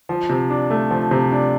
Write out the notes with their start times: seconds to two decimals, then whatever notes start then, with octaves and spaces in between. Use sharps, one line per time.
0.09 F3
0.29 C3
0.50 D4
0.70 A3
0.91 F3
1.11 C3
1.32 D4